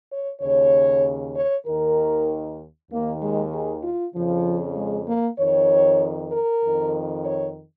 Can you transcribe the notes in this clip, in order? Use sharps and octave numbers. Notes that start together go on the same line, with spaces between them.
C#5
D#2 C#3 C#5
C#5
D#2 D#3 A#4
D#2 D#3 A#3
G#3
G#4
F4
F2 C#3 F3
G#3
A#3
F2 D#3 C#5
A#4
F2 D#3
C#5